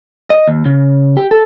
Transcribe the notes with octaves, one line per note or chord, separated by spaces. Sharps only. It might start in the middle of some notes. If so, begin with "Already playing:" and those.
D#5
D#2
C#3
G4
A4